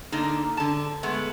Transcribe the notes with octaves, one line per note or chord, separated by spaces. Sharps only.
D3 A#3 D#4
D3 A5
G#3 A3 B3